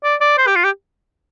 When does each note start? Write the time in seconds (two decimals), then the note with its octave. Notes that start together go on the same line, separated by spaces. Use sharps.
0.03 D5
0.21 D5
0.38 C5
0.47 G4
0.56 F4
0.64 G4